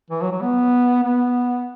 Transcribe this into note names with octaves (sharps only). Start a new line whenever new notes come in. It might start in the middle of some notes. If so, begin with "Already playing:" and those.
E3
F#3
F#3
B3
B3